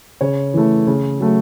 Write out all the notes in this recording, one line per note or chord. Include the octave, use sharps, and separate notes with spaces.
C#3 C#5
E3 A3
C#3
F#3 A3